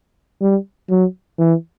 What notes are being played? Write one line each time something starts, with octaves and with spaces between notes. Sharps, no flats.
G3
F#3
E3